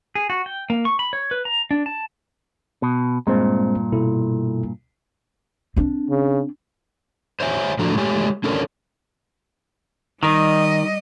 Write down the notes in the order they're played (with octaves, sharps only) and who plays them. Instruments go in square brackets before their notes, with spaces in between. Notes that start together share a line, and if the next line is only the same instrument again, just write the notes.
[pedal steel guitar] G#4
F#4
G5
A#3
C#6
B5
C#5
B4
A#5
D4
A5
[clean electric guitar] B2
[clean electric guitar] G2 A#2 [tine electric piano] G#3 C4 C5
[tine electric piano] B2 E4 A4
[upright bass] C4 D4
[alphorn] C#3
[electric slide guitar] C5 C#5 E5 G#5
A2 F3 D4 F#4 A4 A#5
G#3 A3 G4 C#5 G#5
C#4 D4 E4 A4 A#4 C#5
[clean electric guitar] D#3 [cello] G3 D#5